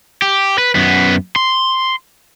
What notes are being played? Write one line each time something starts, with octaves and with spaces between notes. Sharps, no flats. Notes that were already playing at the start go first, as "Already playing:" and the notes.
G4
B4
F#2 B3
C6